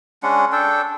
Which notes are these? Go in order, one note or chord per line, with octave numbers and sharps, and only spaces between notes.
G#3 C#4 D4 F#5
D4 A4 G5